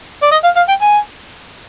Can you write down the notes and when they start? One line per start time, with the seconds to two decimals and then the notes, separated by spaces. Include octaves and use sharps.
0.23 D5
0.32 D#5
0.44 F5
0.57 F5
0.69 G5
0.82 G#5